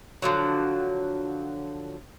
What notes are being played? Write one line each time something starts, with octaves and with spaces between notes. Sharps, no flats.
D3 F3 F#3